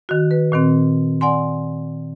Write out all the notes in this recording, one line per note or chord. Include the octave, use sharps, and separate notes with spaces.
D#3 F#4
B4
A#2 D#3 C4
D5 F#5 G#5 C6